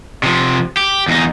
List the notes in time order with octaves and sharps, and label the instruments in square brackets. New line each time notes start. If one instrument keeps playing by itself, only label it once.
[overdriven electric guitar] C3 F3
G4
E2 D#4